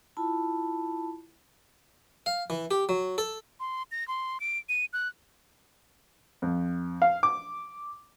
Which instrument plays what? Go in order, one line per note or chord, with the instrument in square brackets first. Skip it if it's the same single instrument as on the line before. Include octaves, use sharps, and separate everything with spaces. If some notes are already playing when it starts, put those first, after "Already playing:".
[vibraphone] E4 F4 A5 B5
[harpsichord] F5
E3
G4
F#3
A4
[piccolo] C6
A#6
C6
D7
D#7
F#6
[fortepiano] F2
F5
D6